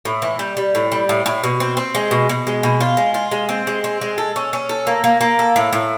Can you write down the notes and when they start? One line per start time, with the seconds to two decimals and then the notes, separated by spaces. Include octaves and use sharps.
0.05 A2
0.22 E3
0.39 G3
0.57 G3
0.75 A2
0.92 G3
1.09 A2
1.26 A2
1.44 B2
1.60 C4
1.77 C4
1.95 G#3
2.11 B2
2.29 B2
2.47 G#3
2.63 B2
2.81 F4
2.97 G#3
3.14 F4
3.31 G#3
3.49 C4
3.67 G#3
3.84 C4
4.01 G#3
4.18 A4
4.36 C#4
4.53 C#4
4.69 A4
4.87 A#3
5.04 A#3
5.21 A#3
5.39 A4
5.56 A2
5.73 A2